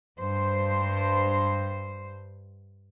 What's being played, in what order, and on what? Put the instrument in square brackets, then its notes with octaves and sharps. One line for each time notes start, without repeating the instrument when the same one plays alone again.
[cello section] G2 C5